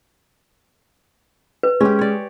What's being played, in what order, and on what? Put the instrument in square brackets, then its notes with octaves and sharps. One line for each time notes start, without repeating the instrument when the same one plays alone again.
[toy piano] B4
[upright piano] G#3 [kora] C#4 G4
[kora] C#5 D5